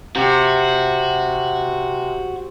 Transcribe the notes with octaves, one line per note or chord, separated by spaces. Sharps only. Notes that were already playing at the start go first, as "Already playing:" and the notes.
C3 F#4